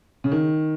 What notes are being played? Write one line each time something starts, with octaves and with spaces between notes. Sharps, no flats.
C#3
D#3